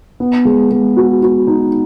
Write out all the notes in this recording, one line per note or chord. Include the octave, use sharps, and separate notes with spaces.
B3
G#3
G#3
F#4
F#4
D#4